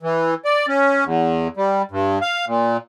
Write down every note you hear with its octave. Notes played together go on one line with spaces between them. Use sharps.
E3
D5
C#4
E2
G3
G2
F5
A#2